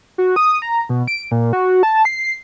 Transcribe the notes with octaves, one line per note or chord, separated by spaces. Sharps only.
F#4
D#6
A#5
B2
D7
A#2
F#4
A5
C7